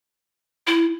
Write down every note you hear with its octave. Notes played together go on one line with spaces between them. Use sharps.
E4